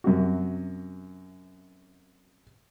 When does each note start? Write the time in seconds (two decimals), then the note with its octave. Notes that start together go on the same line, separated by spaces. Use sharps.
0.04 F#2 C3 F#4